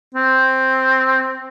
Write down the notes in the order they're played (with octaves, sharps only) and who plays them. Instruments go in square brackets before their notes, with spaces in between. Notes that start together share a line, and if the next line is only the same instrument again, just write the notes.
[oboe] C4